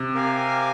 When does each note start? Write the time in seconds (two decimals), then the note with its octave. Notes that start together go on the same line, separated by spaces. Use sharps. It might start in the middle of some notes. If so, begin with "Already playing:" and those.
Already playing: C3
0.14 G4 A#4 F5 G#5